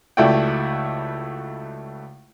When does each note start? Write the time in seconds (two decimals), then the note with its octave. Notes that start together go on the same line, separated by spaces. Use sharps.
0.17 C#2 A3 E4 F#4 D5 G5